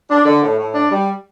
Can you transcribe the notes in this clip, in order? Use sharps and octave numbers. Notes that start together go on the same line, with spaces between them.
D4
D3
A2
A2
D4
G3